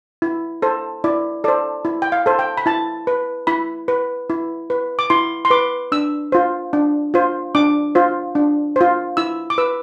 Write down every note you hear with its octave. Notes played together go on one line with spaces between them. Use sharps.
E4
A4 C5
E4 D5
A4 C5 D5
E4
G5
F5
A4 C5
G5
B5
E4 A5
B4
E4 B5
B4
E4
B4
D6
E4 C6
C6
B4 D6
D4 E6
F4 C5
D4
F4 C5
D4 D6
F4 C5
D4
F4 C5
E4 E6
D6
B4 E6